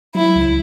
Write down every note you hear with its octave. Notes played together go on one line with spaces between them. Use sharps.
F#3 E4
C#2